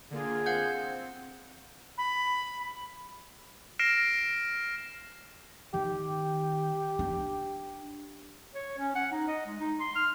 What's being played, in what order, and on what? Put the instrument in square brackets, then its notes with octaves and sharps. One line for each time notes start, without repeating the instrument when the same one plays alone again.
[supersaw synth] D3 A#3 F4 [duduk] G#4
[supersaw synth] C4 [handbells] F5 F#5 G6
[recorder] B5
[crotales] F6 A#6 C7 D7 E7
[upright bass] D#3 [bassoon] G4
[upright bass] D4
[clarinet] C#5
C#4
F#5
D#4
D#5
G#3
D#4
C6
F6